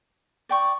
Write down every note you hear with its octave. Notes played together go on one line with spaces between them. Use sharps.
D5 G5 C#6